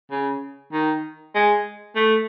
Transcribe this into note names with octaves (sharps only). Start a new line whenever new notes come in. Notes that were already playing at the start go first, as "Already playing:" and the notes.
C#3
D#3
G#3
A3